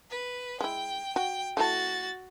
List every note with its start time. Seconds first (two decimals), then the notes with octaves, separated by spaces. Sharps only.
0.11 B4
0.61 G#3 E4 G5
1.16 F#4 G5
1.57 A3 E4 F#4 A5 A6